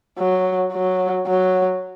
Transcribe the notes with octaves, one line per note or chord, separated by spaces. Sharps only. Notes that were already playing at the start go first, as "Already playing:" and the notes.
F#3
F#3
F#3